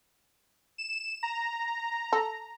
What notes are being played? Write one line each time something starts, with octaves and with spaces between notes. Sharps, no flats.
E7
A#5
A4